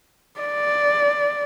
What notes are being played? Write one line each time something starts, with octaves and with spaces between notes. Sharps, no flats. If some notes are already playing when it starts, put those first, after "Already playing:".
D5